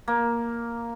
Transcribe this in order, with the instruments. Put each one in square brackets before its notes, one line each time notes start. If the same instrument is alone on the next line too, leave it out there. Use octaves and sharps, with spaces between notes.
[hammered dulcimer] A#3